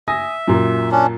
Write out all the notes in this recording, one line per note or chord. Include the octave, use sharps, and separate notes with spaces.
E5 G#5 D#6 A#6
F#2 A#2
C#4 D4